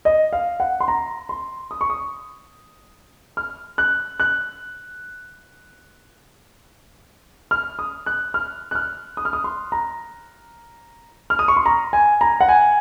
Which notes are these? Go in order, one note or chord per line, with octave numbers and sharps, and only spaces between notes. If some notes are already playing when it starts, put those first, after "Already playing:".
D#5
F5
F#5
C6
A#5
C6
D#6
C#6
D#6
F6
F#6
F#6
F6
D#6
F#6
F6
F#6
F6
D#6
F6
D#6
C6
A#5
F6
D#6
C#6
C6
A#5
G#5
A#5
F#5
G#5